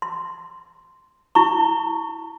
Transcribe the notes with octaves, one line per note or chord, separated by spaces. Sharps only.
C6
E4 A#5 C#6